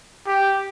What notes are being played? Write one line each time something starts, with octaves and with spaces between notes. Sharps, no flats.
G4